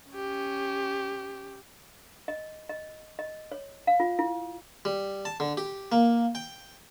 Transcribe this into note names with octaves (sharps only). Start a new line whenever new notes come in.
C#4 G4
D#5
D#5
D#5
C#5
F5
F4
E4
G3
A5
D3
G4
A#3
G5